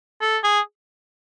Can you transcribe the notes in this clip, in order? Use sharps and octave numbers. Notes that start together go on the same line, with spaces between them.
A4
G#4